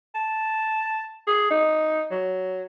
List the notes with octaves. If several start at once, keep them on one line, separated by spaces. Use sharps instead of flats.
A5
G#4
D#4
F#3